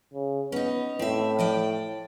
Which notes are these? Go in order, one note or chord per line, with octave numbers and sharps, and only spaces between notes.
C#3
B3 C#4 D#4
A2 C4 E5
F3 D5 G5